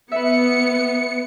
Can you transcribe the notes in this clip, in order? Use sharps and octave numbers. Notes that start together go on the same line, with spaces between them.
B3 B4 E5 C#7